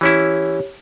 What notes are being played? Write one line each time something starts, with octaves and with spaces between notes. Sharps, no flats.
E3 C#4 E4 G4 C#5